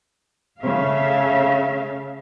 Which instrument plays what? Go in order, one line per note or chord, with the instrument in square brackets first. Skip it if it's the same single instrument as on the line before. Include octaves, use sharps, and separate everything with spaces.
[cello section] C#3 A3 E5 F5